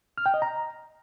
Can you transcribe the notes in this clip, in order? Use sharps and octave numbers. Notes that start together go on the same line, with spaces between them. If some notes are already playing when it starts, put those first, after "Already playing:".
F6
G5
D#5
A#5